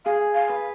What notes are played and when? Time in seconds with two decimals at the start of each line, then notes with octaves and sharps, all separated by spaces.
0.05 G#4 F5
0.35 F5
0.49 B4